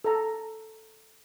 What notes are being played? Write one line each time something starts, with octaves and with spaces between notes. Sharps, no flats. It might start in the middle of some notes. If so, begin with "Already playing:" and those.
A4 A#5